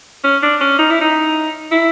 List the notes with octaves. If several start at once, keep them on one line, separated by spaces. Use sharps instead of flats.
C#4
D4
C#4
D#4
E4
D#4
E4